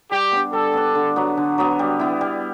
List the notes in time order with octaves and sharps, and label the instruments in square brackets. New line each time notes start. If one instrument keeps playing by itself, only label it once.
[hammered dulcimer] G3 [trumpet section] G4
[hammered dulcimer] B3 D4
[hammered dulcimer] G3 [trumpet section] A4
[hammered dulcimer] B3 D4
D3
F#3 B3
D3
F#3 B3
G3
B3 E4
G3